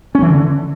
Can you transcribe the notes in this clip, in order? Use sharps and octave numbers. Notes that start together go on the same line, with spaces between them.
C#4
E3
D3